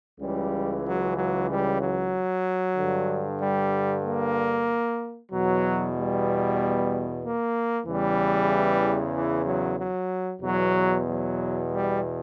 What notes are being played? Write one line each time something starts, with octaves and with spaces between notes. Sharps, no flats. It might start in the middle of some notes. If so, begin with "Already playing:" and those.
C#2 C#3 E3 G3
F#3
F#3
G3
F#3
G2 D3
G3
A#3
E2 B2 F#3
G3
A#3
E2 C#3 E3 G3
E3
F#3
F#3
E2 B2 F#3
F#3
G3